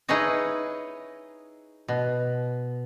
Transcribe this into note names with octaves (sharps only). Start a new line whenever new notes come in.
D#4 E4 G#4 B4 C#5 D#5
B2